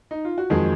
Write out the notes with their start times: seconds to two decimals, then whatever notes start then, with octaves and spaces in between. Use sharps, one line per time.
0.11 D#4
0.25 F4
0.38 F#4
0.50 F2 D#3 F#3 G#3 G#4